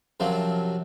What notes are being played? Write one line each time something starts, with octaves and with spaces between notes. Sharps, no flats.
F#2 C3 F3 F#3